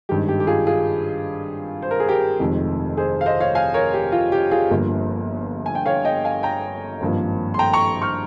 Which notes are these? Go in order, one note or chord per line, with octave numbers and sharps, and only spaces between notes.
G#1 G2 D#3 G#3 G4
G4
G4
F4 G#4
F4 G#4
C5
A#4
G#4
G4 A#4
F1 F2 D#3 G#3
G#4 C5
F5
C5 D#5
C#5 F5
F5 G#5
A#4 C#5
G4
F4
G4
F4 G#4
G1 G2 F3 A#3
G#5
G5
C#5 F5
D#5 G5
F5 G#5
G5 A#5
G#1 G2 F3 A#3
C6
G5 A#5
A#5 C#6
C#6 F6